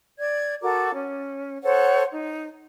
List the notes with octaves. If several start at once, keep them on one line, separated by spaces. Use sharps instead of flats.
D5 G#6
F#4 A4 A#4 D6
C#4
A4 C5 C#5 F#5
D#4